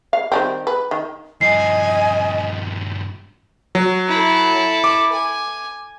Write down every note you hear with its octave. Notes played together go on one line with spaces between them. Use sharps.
F5
D#3 G3 C4
B4
D#3
G2 F3 D#5 G#5 C7
F#3
E4 A4
D6
G#5